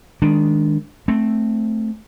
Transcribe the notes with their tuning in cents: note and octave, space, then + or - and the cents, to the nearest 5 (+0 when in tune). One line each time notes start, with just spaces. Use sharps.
D#3 +15 G#3 +0 D4 +5
A3 +0 C4 +5